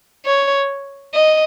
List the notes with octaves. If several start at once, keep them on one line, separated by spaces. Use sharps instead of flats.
C#5
D#5